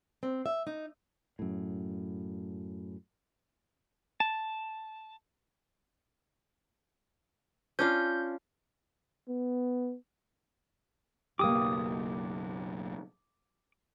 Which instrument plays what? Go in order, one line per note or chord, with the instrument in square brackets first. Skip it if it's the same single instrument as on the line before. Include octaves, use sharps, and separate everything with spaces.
[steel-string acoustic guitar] C4
E5
D#4
[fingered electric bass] F#2 A2
[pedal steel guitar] A5
[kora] C#4 D4 F4 [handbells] G6
[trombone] B3
[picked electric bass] F#1 B1 [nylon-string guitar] A#3 G4 [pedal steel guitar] D6 D#6